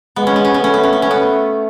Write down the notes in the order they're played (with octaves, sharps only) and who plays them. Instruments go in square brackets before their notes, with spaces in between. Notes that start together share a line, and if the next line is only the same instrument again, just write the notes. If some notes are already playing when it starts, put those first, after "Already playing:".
[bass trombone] G#3 [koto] B3
[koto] C#4
B3
C#4
B3
[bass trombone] A3 [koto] C#4
[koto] B3
C#4
B3
[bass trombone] A3 [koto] C#4
[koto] B3